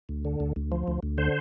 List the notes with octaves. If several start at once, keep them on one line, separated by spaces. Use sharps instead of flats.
D2
D3
D2
D2
F3
D2
D2
D3 C5